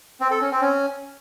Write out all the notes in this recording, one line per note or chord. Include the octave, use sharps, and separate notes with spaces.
C4
A4
C#4
C4
C#4